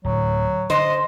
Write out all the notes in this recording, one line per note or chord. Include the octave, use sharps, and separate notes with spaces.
D1 F#3
D3 C5 D#5